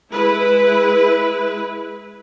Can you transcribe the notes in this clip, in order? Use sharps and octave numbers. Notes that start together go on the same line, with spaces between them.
G#3 E4 B4